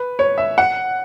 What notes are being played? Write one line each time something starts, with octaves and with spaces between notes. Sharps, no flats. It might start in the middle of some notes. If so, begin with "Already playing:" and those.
Already playing: B4
C#5
E5
F#5